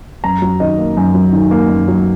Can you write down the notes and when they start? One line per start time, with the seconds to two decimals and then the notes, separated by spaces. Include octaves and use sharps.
0.24 F#2 A#5
0.42 F#3
0.60 D#3 D#5
0.78 A#3
0.97 F#2
1.14 F#3
1.33 D#3
1.51 A#3
1.69 F#2
1.88 F#3